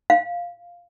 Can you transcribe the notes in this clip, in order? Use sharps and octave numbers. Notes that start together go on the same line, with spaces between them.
F5